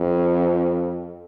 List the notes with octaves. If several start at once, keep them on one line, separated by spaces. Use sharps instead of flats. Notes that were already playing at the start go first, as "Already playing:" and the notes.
Already playing: F2